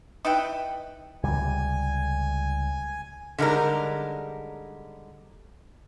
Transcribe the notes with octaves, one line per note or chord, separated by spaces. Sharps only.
D#4 E4 B4 G5
C#2 C3 G3 G#5
D3 G3 G#3 D#4 A#4